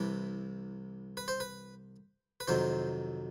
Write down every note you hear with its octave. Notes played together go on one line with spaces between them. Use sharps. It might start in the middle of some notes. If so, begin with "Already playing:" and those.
Already playing: C2 C3 E3 B4
B4
C5
B4
B4
F2 C3 D#3 F#3 C5